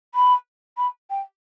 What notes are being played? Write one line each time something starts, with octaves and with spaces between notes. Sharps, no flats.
B5
B5
G5